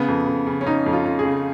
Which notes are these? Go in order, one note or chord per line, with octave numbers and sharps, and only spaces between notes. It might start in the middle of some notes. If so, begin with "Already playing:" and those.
Already playing: C#3 B3
F2
F2
C#3
C#4
C#3 D#4
F2
F4
F2
G#4
C#3